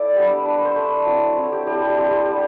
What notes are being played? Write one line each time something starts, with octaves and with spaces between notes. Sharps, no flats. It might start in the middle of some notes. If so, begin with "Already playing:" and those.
Already playing: E4 A4 D5 E5
G3 B3 D4
A3 D4 B4
C5
A3 D4 B4
F#3 C4 E4
F#3 C4 E4
A4
G4
G3 C4 E4 G4
G4
G3 C4 E4 G4
G3 B3 D4